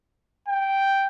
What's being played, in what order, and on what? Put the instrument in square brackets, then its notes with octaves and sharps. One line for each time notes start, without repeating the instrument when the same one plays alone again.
[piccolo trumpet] G5